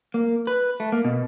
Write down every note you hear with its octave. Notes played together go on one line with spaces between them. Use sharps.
A#3
B4
A3
A#3
B2